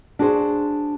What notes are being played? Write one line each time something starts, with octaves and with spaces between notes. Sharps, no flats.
D4 F#4 G#4 C5